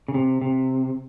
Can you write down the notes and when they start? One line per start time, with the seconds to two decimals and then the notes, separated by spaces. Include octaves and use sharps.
0.08 C#3
0.14 C3
0.42 C3